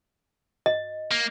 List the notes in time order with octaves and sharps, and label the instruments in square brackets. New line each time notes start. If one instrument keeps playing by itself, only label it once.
[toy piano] D#5
[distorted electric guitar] A#3